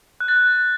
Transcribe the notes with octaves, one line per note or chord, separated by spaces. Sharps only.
F#6
A6
F#6